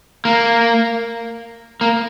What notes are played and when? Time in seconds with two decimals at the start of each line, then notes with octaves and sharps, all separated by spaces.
0.25 A#3
1.81 A#3